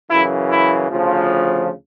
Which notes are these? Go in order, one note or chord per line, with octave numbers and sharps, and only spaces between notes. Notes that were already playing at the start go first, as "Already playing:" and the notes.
F#2 C#3 E3 E4
E4
D2 C#3 F3